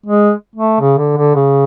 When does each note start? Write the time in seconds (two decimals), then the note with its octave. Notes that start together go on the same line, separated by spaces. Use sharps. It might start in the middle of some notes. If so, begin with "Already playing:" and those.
0.06 G#3
0.56 A3
0.80 C#3
0.98 D3
1.17 D3
1.35 C#3